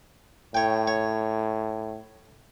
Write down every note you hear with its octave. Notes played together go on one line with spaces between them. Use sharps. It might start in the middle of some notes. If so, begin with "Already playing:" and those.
A2 C#5 G5
C#5